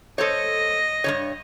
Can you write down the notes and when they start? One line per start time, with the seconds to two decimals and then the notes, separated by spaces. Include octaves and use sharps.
0.18 A4 C5 C#5 D#5
1.04 G2 E3 C#5